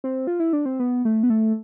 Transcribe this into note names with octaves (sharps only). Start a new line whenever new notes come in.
C4
F4
E4
D4
C4
B3
A3
B3
A3